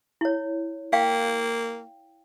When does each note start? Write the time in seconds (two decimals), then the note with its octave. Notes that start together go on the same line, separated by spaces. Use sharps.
0.21 E4 C#5
0.93 A#3 F5 G5